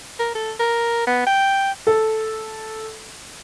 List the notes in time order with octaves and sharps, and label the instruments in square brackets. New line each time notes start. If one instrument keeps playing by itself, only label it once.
[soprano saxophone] A#4
A4
A#4
B3
G5
[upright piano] A4